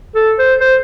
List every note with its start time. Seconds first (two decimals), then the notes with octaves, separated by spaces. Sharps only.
0.15 A4
0.38 C5
0.61 C5